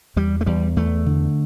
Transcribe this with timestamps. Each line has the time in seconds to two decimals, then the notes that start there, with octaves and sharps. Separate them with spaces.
0.16 E2 G3
0.41 A3
0.46 E2 G3
0.76 E2 A3
1.06 D3